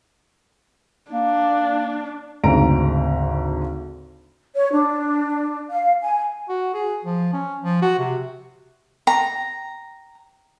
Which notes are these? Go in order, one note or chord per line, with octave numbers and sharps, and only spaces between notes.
A#3 D4
G#1 D2 C#3 C4 A#5 D7
C#5
D4
F5
G#5
F#4
G#4
F3
C#4
F3
F#4
C3
G5 A#5